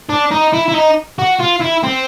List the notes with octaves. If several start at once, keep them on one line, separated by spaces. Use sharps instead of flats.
D4
D#4
E4
E4
D#4
F#4
F4
E4
C4